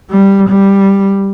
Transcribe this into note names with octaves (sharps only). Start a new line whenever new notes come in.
G3
G3